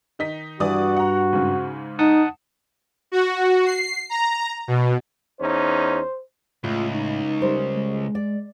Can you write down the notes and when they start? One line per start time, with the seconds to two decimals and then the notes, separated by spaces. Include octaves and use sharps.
0.19 D#3 D#4 B6
0.60 G2 E3 F#4 D5 D#6
0.97 F#5 A#5
1.33 G#2 C#3
1.99 D#4 F#5 A5 D#6
3.12 F#4
3.66 C7
4.10 A#5
4.68 B2
5.40 E2 C#4 D#4 C5
6.64 C#2 A2 F4
6.94 D#4
7.41 G3 A#4 C5
7.76 G#3
8.15 D5